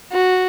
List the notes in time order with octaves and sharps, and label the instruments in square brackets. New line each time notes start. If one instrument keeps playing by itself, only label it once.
[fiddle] F#4